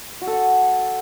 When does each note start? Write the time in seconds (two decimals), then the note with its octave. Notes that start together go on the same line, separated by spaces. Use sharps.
0.21 F#4
0.27 A4
0.33 F#5